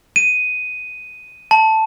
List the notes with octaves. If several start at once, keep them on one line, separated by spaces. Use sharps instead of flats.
D#7
A5